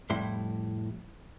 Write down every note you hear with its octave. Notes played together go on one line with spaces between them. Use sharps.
F2 A2 G3 E4 C6